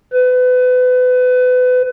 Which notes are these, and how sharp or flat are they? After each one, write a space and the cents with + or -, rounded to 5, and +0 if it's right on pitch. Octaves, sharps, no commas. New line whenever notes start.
B4 +30